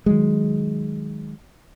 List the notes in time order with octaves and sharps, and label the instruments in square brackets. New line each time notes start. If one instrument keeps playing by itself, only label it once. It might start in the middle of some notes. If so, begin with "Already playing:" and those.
[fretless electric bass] D#3 F#3 G#3